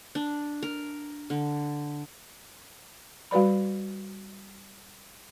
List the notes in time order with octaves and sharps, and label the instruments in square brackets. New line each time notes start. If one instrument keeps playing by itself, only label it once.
[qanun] D4
A#4
D3
[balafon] G3 F#4 B4 D5 B5